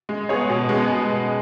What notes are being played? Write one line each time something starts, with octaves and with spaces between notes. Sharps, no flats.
G#3
B3 G#4 C#5
B2
G#3 B3 G#4